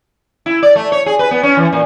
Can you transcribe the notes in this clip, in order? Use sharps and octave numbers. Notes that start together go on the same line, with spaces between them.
E4
D5
A3
C#5
G#4
B4
B3
C#4
E3
A#2